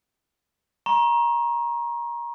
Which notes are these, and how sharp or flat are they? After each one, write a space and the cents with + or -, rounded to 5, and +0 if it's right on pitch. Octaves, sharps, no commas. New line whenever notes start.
A#5 +25 C#6 -40